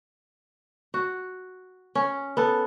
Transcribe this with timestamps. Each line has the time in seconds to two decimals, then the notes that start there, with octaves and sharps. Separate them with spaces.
0.94 F#4
1.95 C#4
2.37 B3 A4